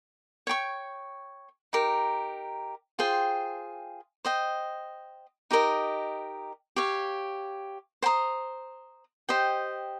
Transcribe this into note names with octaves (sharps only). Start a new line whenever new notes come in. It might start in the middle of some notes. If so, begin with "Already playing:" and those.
C#5 G5 C#6
D#4 G4 A#4
F4 G#4 C5 G5
C5 D#5 G5
D#4 G4 A#4 D#5
G4 C#5 F5
C5 G5 A#5 D#6
G4 C5 D#5 G5